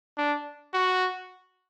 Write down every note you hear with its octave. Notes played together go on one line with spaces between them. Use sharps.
D4
F#4